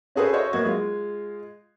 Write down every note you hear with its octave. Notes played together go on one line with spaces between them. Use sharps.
C#4 F#4 G#4 A4 B4 C5
F#4 A4 C5 C#5 D#5 E5
F#2 A#3 B3 F#4 G#6
G#3 F4